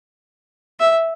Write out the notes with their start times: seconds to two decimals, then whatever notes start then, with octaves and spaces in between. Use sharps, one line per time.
0.80 E5